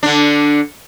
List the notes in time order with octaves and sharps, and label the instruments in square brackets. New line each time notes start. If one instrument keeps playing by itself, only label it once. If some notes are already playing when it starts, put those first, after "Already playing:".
[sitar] D3 D4